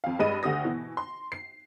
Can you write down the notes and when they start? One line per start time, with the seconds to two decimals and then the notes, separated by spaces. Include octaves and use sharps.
0.04 F2 F5
0.19 G2 G#3 D#5 D#7
0.43 D2 D3 G4 D#6 A#6
0.64 B2 E3
0.97 C6
1.32 C7